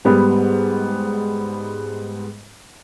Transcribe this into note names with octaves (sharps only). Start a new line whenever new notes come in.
G#2 G3 B3